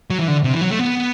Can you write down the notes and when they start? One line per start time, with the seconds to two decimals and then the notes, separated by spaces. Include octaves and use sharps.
0.10 F#3
0.19 E3
0.28 D3
0.44 C3
0.53 E3
0.61 F#3
0.70 A3
0.79 B3